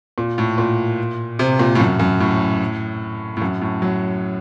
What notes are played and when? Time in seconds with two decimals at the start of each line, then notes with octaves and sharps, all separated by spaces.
0.18 A#2
0.38 A2
0.58 A#2
1.39 C3
1.59 A#2
1.75 A2
1.80 F#2
1.99 F#2
2.20 A2
3.37 A2
3.41 F#2
3.61 A2
3.82 F#3